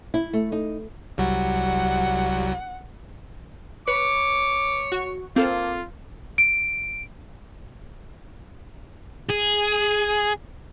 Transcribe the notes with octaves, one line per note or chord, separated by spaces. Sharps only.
E4
A3
D#4
C2 F#3 G3 F#5
B4 C#5 D6
F#4 C#6
A#3 C4 F4 A4 F5
D7
G#4